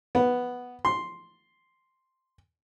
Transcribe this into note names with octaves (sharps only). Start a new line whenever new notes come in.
B3
C6